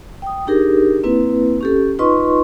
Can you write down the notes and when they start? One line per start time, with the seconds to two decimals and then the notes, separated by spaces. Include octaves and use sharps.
0.22 G5 D#6
0.47 D4 D#4 G4 G#4 A#4
1.03 A#3 C4 E4 B4
1.61 C#4 G4 A4
1.99 D#4 F4 B4 D#5 C6 C#6